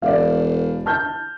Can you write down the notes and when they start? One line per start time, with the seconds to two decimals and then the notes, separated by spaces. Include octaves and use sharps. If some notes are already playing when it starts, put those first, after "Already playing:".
0.02 E1 D5 F5
0.86 A5 F6 G6